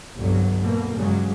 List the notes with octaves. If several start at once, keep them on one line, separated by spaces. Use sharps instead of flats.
G1 C2 F#3
D2 B2 A#3
G2 C#3 F#3 G#3